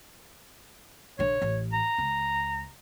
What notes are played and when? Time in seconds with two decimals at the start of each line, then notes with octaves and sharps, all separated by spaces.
1.19 A#1 D3 C#5
1.42 A1
1.73 A#5
1.98 C#2